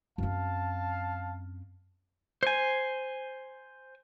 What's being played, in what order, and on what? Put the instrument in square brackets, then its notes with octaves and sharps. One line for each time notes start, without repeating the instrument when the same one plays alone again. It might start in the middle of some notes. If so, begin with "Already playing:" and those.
[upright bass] F#2 C4 [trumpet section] F5 A5
[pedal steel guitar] C5 G#5